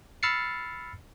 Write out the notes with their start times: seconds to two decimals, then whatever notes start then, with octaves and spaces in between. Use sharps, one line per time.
0.23 B5 E6 F6 A6 C7 C#7